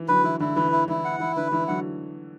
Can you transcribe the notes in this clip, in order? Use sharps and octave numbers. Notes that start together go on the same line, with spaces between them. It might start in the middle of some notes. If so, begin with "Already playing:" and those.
Already playing: E3
D3 F#3 B4
E3 E4
D3 E4
E3 B4
E4
E3 E4
F#5
E3 E4
D3 B4
E3 E4
D3 F#3 F#5